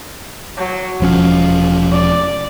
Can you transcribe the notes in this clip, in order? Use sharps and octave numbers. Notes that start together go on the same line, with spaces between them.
F#3
E1 F3 C#4 F4
D5